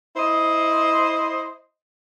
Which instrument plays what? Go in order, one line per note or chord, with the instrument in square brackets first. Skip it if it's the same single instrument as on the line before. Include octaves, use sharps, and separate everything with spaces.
[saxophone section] E4 C5 D#5